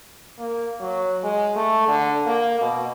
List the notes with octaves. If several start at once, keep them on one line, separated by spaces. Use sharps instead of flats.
A#3
F#3
G#3
A3
D3
A#3
B2